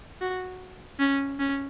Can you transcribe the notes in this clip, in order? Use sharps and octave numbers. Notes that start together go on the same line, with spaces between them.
F#4
C#4
C#4